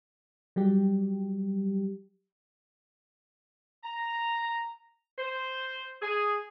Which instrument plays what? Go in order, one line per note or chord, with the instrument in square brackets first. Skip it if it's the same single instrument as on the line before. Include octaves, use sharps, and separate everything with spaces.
[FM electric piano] F#3 G3 G4
[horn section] A#5
C5
G#4